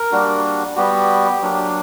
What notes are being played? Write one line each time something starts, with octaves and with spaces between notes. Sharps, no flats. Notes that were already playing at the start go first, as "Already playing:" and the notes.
Already playing: A#4
G3 A#3 D4 F#4
G3 B3 F#4 G4
F#3 A#3 D4